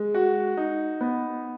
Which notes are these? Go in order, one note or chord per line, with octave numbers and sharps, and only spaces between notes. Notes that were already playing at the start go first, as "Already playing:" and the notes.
Already playing: G#3
F#4
D#4
B3